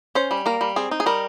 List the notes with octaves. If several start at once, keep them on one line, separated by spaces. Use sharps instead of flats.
C#4 C5
G3
A#3 A#4
G3
C4 G#4
D#4
G#4
G3 A#4